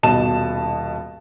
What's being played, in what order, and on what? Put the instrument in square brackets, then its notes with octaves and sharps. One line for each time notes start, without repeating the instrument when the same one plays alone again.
[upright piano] D#1 B2 D#5 A5 E7